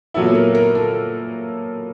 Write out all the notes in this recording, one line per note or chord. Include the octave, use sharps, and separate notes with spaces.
A#2 F#3 B3 E4 A4
A#4
A#4
A4